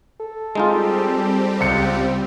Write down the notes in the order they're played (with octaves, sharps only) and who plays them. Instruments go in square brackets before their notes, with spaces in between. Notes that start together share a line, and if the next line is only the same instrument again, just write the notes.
[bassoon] A4
[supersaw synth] G3 C4 G4 [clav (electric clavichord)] G#3 D#4 F4
[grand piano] C#2 C#7